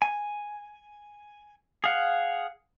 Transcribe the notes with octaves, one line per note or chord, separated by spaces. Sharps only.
G#5
G#4 F5 F#5